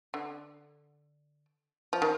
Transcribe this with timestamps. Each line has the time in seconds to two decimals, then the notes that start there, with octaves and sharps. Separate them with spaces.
0.14 D3
1.93 F3
2.02 D#3